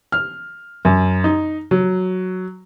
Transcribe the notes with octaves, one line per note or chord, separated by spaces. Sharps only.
F6
F#2
D#4
F#3